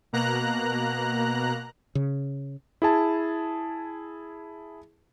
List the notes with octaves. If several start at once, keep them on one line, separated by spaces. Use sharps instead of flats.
B2 A#3 A#5 F#6
C#3
E4 G#4 A5